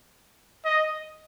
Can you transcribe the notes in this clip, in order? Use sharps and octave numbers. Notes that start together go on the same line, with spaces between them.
D#5